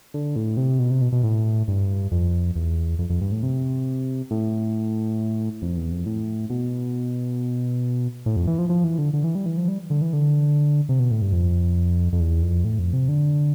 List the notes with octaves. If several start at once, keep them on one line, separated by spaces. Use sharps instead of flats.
D3
A2
C3
B2
C3
B2
B2
A2
G2
F2
E2
F2
F2
G2
A2
C3
A2
F2
E2
F2
A2
B2
A2
F2
E3
F3
F3
E3
D3
D3
E3
G3
E3
F3
G3
D3
E3
D3
C3
B2
A2
G2
F2
F2
E2
F2
A2
F2
C3
D3